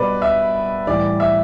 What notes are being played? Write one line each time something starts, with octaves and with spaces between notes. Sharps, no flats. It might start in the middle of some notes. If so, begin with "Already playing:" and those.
Already playing: B2 G3 B4 D5
E5
A2 E3 G3 D5
E5